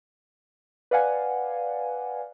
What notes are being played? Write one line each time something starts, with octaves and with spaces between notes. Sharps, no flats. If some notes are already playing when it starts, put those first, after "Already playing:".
B4 D5 F5 F#5 G#5